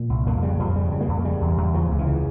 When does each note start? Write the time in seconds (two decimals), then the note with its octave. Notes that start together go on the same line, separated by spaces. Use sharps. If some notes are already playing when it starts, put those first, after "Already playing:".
Already playing: A#2
0.10 C2
0.26 F2 A#3
0.42 C#3 G3
0.59 F2 F3
0.76 C#3 G3
0.92 C#3
1.01 A#3
1.08 F2
1.25 C#3 G3
1.41 E2
1.58 E2
1.74 C#3 F3
1.91 C#2
1.99 E3
2.07 C#3